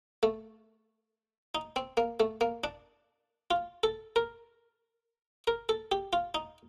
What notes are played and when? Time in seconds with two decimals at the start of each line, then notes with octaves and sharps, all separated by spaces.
0.23 A3
1.55 D#4
1.76 C4
1.97 A#3
2.20 A3
2.41 A#3
2.64 D4
3.51 F4
3.83 A4
4.16 A#4
5.47 A#4
5.69 A4
5.92 G4
6.13 F4
6.35 D#4